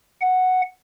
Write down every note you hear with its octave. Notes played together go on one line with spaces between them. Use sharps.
F#5